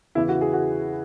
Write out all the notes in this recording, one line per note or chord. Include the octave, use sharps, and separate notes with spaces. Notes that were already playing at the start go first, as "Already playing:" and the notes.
E2 C#3 E3 E4
F#4
G#4
F#4